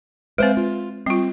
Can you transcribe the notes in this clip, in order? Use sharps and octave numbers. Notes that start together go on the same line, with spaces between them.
G#3 C4 B4 C5 F5
F4
G3 C4 F4